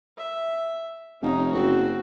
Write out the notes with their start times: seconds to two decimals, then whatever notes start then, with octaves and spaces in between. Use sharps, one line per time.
0.18 E5
1.22 F1 C#4 D#4
1.52 F#1 C4 F#4